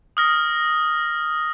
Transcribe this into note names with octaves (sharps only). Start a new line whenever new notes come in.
D#6 F6 A#6